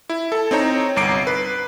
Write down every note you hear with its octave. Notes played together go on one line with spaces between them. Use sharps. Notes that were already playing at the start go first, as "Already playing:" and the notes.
E4
A4 A5
C4 D#4 C#5 A#5
G1 C2 A#5 D6 C7 D7
B4